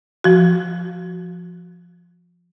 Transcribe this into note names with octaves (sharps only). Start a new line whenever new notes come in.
F3 F#4